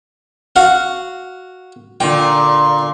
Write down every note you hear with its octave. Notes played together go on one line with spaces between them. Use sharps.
F#4 F5 F#5
A#2 D3 G5